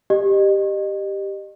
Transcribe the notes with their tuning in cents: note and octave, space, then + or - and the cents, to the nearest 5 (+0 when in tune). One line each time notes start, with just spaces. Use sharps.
G4 +0 D#5 -30